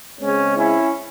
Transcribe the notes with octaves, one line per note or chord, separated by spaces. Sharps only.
C#3 G#3 C4 C#4
C#4 E4